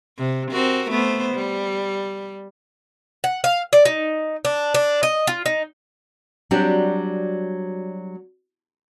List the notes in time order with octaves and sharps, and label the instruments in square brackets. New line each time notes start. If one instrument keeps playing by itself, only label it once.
[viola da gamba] C3
C4 F#4 A#4
A3 B3 C5
G3
[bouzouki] F#5
F5
D5
D#4
D4
D4
D#5
F4
D#4
[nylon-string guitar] F#3 G3 C4 D4 F#4 G4